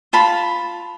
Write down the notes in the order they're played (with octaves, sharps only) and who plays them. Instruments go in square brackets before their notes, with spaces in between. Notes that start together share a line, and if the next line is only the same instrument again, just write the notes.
[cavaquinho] F4 A5 B5